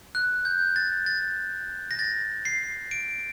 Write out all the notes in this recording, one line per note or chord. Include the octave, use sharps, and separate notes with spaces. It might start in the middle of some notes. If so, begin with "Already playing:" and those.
F#6
G6
A6
A6
A#6
A6
C7
D7